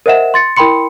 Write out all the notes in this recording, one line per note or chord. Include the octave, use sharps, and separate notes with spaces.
A#4 C5 D#5 E5 F#5 E7
C6 A6 C#7
E4 A#4 G5 B5 C6 C#7